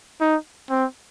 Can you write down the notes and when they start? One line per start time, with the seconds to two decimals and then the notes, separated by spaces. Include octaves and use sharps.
0.21 D#4
0.70 C4